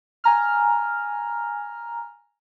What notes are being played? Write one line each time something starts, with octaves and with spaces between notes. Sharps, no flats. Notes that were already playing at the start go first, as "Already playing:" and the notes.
G#5 A#5 F6